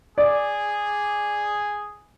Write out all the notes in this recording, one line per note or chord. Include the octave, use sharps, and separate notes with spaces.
G#4 D5